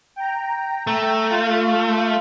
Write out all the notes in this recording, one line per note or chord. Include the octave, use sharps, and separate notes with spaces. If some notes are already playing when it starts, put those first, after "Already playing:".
G5 A#5
A3
F4 F5